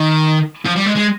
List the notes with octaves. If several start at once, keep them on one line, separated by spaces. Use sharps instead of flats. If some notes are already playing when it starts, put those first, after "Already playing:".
Already playing: D#3
F3
G3
G#3
G#3